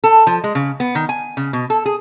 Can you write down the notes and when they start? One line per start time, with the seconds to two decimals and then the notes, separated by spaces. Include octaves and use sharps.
0.04 A4
0.27 F3
0.44 G#3
0.55 C#3
0.80 B3
0.95 D#3
1.09 G#5
1.37 C#3
1.53 B2
1.70 A4
1.86 G#4